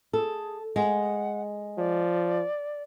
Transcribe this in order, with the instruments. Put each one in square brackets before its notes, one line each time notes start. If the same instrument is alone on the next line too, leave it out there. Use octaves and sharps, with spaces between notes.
[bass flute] G#4 [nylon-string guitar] A4
[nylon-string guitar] G#3 [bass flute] F#5
[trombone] F3 [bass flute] D5